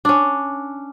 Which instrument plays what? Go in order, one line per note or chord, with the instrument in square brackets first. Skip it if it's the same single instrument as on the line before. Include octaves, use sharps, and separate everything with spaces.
[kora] C#4 D4